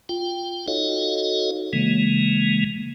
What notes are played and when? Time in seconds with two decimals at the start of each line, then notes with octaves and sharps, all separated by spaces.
0.09 F4 G5
0.68 D#4 F#4 A4 C#5 D#5 F5
1.73 C#3 E3 G#3 A#3